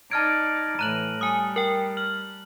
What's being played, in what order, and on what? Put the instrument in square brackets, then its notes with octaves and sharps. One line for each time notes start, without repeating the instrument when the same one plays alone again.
[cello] D#4 D5 [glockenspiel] A5 F6 D7 [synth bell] G#6
[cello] A2 E3 [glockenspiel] A#5 F#6 F#7 [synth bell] D#7
[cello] G3 [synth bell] G#5 D#6
[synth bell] A#4 G5
[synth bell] F6 [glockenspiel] F#7